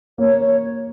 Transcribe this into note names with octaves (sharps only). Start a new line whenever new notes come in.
A#3 C#5
C#5